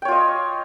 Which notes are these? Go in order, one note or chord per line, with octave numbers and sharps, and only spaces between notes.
F4 C#5 D#5 G5